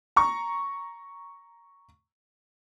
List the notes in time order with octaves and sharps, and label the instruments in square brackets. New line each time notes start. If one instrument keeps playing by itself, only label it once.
[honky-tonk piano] A#5 C#6